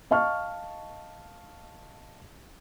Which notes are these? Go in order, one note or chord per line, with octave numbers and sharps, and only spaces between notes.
D#5 F5 A5 C#6 F6